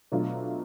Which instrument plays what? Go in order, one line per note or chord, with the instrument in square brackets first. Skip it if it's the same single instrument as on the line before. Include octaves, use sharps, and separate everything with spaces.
[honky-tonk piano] B2 F#3 A3 D4 F4